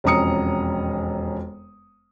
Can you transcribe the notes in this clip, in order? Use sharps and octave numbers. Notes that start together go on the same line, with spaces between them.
E1 F2 C#4 A#5 D#6 C#7